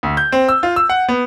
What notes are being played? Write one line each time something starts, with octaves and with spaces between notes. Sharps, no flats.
D2
G6
C4
E6
F4
E6
F#5
B3